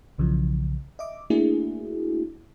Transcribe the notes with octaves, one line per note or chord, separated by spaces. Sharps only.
B1 C#3 E3 F3
D#5 E5 D6
A3 A#3 D4 E4 F#4 G#4